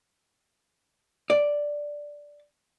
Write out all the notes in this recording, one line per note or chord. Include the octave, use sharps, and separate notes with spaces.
D5